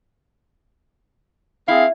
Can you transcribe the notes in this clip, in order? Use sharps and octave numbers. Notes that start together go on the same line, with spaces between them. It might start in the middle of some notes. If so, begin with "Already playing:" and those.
C4 E4 G#4 F5